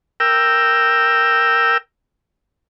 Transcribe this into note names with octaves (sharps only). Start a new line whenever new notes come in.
A#4 G5 E6